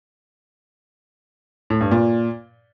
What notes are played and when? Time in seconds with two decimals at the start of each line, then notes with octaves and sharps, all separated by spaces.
1.70 A2
1.81 G2
1.91 A#2